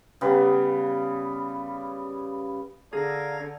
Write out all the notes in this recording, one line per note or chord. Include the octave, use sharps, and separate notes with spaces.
C#3 G3 B3
D3 G#4 F5 A#5 G#6 A#6